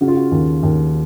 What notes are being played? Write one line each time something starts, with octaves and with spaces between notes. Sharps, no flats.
C#3 F#4
F4
F#4
D#2
D#2